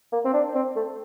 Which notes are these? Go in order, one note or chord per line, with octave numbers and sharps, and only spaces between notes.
A#3
C4
D4
C4
A3